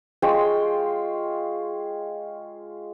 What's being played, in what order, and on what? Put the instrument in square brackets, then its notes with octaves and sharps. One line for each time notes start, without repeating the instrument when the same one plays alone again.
[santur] G#3 F4 C#5 G5